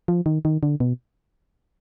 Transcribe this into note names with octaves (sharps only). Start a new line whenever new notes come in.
F3
D#3
D#3
D3
B2